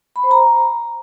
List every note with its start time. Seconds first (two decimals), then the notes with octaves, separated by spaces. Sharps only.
0.16 B5
0.23 C5
0.31 A#5